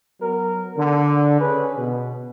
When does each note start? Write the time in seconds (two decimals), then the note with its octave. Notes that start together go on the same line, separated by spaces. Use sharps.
0.21 F#3 B3 A#4
0.77 D3
1.39 C#4 G#4 B4
1.77 B2